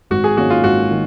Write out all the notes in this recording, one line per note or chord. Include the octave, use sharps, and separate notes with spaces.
G#1 F#4
G#4
G#2 D#3 A#3 C#4 F#4
F4
G#1 F#4
D#3